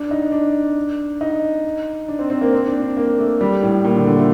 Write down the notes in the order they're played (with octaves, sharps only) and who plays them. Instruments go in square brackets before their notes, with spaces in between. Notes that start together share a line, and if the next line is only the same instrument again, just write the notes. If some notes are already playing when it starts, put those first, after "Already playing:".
Already playing: [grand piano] D4
D#4
D4
D#4
D4
C4
C4
A#3
C4
D4
D4
A#3
A3
G3
A2
A#2
D3
D3
A3